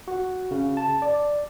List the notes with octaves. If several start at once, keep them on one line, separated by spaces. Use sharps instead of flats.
F#4
C#3
A5
D5